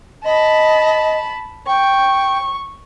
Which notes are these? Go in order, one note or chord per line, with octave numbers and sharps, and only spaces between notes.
D#5 A5 B5
G5 C#6